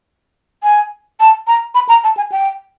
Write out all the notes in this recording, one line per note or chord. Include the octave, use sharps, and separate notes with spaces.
G#5
A5
A#5
B5
A#5
A5
G#5
G5